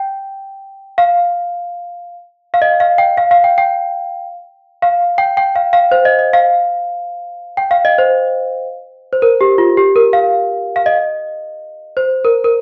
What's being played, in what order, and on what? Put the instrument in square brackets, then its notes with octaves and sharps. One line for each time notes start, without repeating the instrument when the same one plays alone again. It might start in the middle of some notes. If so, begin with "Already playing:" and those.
Already playing: [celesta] G5
F5
F5
D#5
F5
G5
F5
F5
G5
G5
F5
G5
G5
F5
F5
C5
D#5
D#5
F5
G5
F5
D#5
C5
C5
A#4
G4
F4
G4
A#4
F5
F5
D#5
C5
A#4
A#4